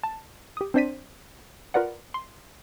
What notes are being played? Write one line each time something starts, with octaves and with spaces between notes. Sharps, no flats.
A5
G4 D#6
C4 D4 C5 D5 B6 D#7
F4 A#4 B4 D5 F#5
C6